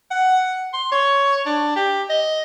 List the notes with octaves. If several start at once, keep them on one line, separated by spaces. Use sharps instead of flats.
F#5
C6
C#5
D4
G4
D#5